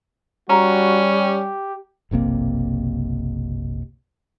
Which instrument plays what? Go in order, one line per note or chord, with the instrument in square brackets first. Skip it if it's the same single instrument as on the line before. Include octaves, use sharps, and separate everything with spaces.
[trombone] G3 [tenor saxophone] C#4 [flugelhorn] F#4 [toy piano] A#5
[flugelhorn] G4
[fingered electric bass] F#1 B1 C3 A#3